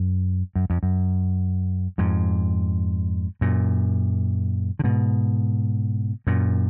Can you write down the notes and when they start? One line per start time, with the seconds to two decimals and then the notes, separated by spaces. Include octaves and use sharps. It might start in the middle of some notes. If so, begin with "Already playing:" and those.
Already playing: F#2
0.55 F#2
0.70 F2
0.83 F#2
1.98 F2 G#2
3.41 F#2 A#2
4.79 D3
4.84 G#2 B2
6.27 F#2 A#2